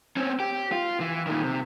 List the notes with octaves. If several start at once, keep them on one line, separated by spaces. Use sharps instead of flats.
C4 C#4
G4
F4
E3
A#2 D#3
C3